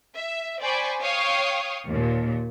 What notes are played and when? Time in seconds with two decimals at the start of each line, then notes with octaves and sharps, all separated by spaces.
0.15 E5
0.60 C5 D5 G5 G#5 B5 C#6
1.03 C#5 F5 G5 C#6 D#6
1.87 D#2 A#2